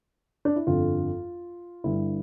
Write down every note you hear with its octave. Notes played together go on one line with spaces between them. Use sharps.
D4
E4
G1 F2 D3 F4
G1 G2 D3 E4